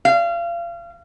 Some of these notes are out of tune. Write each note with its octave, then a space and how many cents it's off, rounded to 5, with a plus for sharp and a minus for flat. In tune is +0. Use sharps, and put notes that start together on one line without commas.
F5 -30